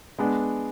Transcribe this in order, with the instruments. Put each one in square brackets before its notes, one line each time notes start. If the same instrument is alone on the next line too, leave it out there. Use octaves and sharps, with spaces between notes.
[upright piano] G#3 B3 D4